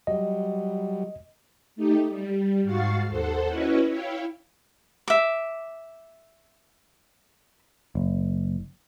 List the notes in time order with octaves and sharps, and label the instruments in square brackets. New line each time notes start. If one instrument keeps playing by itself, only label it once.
[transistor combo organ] F#3 G3 [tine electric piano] D#5
[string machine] A3 D#4 G4
G3
G#2 F#4 F5 C#6 A6 C7
D#2 A4 C5 F#5
C#4 E4 F#4 B4 C#5 D#5
E4 C#5 F5 G5
[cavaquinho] E5 D6
[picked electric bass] F#1